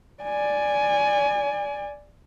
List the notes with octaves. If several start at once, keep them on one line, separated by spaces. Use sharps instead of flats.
D5 G#5